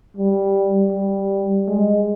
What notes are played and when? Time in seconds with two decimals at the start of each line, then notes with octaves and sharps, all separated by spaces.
0.17 G3
0.92 G3
1.68 G#3